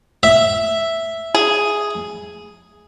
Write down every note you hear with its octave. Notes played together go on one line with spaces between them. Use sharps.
E5
G#4